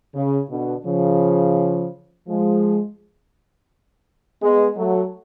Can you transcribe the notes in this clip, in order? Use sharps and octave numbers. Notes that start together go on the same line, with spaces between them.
C#3
B2 D3
C#3 F3
F3 G#3
G#3 B3
F#3 A3